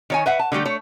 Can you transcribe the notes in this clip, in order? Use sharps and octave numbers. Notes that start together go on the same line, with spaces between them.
D#3 C#5 G#5
B4 E5 F#5
A5
D3 G3 A3 G4
A3 C#5